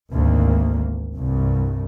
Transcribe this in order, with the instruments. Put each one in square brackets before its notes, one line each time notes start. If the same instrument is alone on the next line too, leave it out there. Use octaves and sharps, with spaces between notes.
[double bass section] G#1 D2 A#3
C2 G2